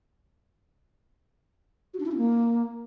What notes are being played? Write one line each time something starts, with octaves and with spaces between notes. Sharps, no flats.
F#4
D4
E4
C#4
A#3